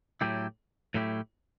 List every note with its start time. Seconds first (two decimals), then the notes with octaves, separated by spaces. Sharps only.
0.21 A2 F#3 A3 E4 G4
0.94 A2 F#3 A3 E4 G4